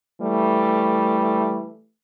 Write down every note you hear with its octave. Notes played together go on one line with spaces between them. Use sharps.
E3 G3 A3